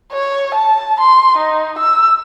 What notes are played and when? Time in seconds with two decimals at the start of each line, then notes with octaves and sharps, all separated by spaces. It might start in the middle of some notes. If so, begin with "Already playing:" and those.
0.12 C#5
0.55 A5
1.01 C6
1.38 D#4
1.79 E6